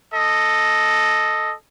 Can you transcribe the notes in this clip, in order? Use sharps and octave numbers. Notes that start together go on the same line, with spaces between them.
A4 D#5